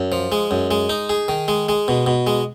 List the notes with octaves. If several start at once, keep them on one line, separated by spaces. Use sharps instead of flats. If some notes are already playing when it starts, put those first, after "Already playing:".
Already playing: F#2
F3
G#3
F#2
G#3
D#4
G#4
D#3
G#3
G#3
B2
B2
G#3